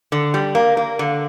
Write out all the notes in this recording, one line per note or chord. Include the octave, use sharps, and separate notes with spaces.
D3
G3
A#3
A#3
D3